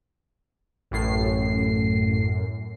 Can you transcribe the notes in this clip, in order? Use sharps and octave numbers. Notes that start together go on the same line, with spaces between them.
A1 F#2 A2 C7